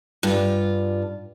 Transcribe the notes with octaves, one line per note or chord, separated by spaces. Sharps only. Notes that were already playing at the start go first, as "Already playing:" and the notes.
G2 F4